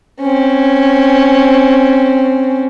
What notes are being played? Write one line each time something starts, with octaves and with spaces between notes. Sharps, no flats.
C4 C#4